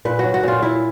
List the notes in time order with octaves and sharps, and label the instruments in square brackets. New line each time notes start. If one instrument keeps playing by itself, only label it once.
[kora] A#2 B4
F#3 F#4
F#4
A#2 F4
A#2 E4